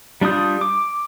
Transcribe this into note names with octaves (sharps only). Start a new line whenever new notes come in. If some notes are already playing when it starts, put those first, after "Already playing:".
G3 D4 F4 D#6 G6
D6